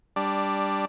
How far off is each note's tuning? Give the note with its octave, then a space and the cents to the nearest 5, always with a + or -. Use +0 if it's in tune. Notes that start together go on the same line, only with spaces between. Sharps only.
G3 +10 D4 +0